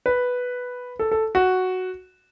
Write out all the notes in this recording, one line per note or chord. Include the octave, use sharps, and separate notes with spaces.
B4
A4
A4
F#4